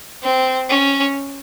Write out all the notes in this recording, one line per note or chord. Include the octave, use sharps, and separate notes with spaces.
C4
C#4